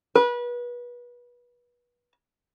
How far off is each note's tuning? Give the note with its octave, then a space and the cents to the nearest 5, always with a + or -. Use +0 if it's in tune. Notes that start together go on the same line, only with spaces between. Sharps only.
B4 -30